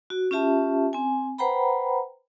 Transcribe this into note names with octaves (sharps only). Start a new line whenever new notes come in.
F#4
C#4 F4 G4 E5 A5
C4 G#5
B4 C5 F#5 G5 A#5 B5